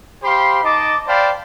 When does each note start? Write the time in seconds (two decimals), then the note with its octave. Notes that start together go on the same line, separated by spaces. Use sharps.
0.23 G4 C5 F5 B5 C6
0.63 D#4 D#5 A5 D6
1.07 C5 D5 F5 G5 A5 B5